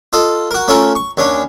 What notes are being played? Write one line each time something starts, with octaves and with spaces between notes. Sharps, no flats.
F4 A4 D#5
F#4 A#4
A3 C#4 F4 A4 A#4
C#6
D#2 C#4 D4